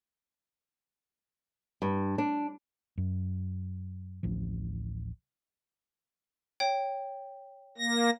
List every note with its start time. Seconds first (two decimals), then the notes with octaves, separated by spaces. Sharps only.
1.82 G2
2.18 D4
2.98 F#2
4.23 D1 A1 F3
6.60 C#5 G5
7.78 A#3 A#6